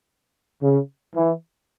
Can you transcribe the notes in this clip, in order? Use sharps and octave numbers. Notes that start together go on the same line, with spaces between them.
C#3
E3